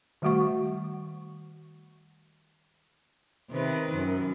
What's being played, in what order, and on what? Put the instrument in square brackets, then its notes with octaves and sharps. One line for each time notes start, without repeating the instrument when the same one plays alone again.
[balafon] D#3 G3 A3 F#4 F#5 C#6
[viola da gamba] C3 D#3 B4
F#2